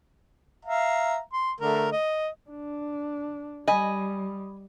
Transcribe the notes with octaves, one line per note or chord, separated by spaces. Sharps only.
E5 F5 A#5
C6
D3 A3 A#4
D#5
D4
G3 D#5 G#5 B5